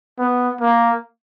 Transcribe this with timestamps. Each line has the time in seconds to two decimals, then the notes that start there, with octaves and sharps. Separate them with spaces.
0.19 B3
0.61 A#3